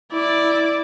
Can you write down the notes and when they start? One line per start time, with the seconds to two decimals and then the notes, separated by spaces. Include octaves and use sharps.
0.13 E4 D5